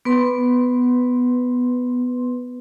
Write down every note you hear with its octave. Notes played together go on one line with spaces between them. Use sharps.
B3 B4 C6